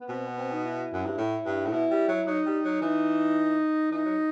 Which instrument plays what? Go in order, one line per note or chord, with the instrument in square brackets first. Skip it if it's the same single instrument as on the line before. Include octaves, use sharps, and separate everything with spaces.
[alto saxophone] B3
[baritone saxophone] B2 [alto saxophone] C4
[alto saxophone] B3
C4
D#4
E4
[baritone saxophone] F#2
G2
A2
G2
A2
[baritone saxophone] B2 [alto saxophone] E4
[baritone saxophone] G3
F#3
[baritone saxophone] F#3 [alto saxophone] D#4
[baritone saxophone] G3
F#3
[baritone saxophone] E3 [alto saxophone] D#4
[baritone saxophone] E3 [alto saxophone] D#4
[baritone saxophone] F#3